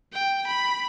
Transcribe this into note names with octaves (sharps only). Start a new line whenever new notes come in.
G5
B5